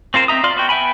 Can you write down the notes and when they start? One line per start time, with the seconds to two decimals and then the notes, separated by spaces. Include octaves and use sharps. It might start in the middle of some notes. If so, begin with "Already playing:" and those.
0.14 C4 F4 A#4 C5
0.28 C4 D#4 E5 A#5 D#6
0.43 F4 D5 F5 C6 F6
0.56 B3 F#4 G5
0.69 B3 E5 G5 G#5 B5